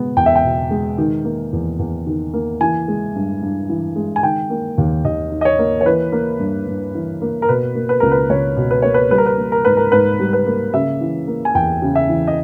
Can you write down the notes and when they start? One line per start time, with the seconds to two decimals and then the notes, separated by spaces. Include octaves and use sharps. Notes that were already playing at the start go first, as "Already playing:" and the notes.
Already playing: B2 G#3 B3
0.17 E2 G5
0.26 E5
0.36 G5
0.44 B2
0.71 G#3
0.98 D#3
1.25 A#3
1.53 E2
1.79 E2
2.06 D#3
2.34 A#3
2.61 E3 G#5
2.88 G#3
3.15 G2
3.42 G2
3.69 E3
3.96 G#3
4.16 G#5
4.23 D#3 G5
4.50 A#3
4.78 D#2
5.05 D#2 D#5
5.32 D#3
5.41 D#5
5.45 C#5
5.59 A#3
5.81 C#5
5.86 E3 B4
6.12 A#3
6.39 G2
6.67 G2
6.95 E3
7.22 A#3
7.42 A#4
7.49 B2 B4
7.75 A#3
7.89 B4
8.00 C#2 A#4
8.12 B4
8.30 C#2 C#5
8.57 B2
8.71 B4
8.82 A#3 C#5
8.94 B4
9.11 G3 B4
9.18 A#4
9.26 B4
9.38 A#3
9.52 A#4
9.65 G#2 B4
9.77 A#4
9.92 G#2 B4
10.19 G3
10.33 B4
10.46 A#3
10.74 C#3 E5
11.01 E3
11.28 A#3
11.45 G#5
11.55 E2 G5
11.82 C#3
11.95 E5
12.09 E3
12.27 D#5